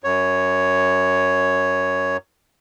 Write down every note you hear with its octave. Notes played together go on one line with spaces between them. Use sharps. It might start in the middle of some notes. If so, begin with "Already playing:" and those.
F#2 C#5